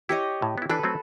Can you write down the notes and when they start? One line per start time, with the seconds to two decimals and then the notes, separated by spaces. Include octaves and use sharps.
0.09 E4 G4 C#5 D#5
0.42 A2
0.58 B3 E4
0.69 E3 D4 A4 B4
0.83 F#3 A3 C4